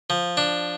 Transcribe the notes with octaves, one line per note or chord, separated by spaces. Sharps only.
F3
D4